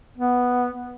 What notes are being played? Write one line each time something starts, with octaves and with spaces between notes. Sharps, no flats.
B3